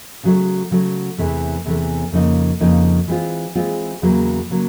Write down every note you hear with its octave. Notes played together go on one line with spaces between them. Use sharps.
C#3 F#3 A3
C#3 F#3 A3
E2 C3 E3 A3
E2 C3 E3 A3
F2 C#3 F3 A#3 D#4
F2 C#3 F3 A#3 D#4
E3 G#3 C4 F4
E3 G#3 C4 F4
E2 C#3 F#3 A#3
C#3 F#3 A#3